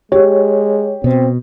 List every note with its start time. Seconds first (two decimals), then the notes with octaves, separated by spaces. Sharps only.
0.12 G#3 G4 C#5
1.04 B2 C4